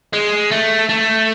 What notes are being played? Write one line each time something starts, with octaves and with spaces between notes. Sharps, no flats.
G#3
A3
A3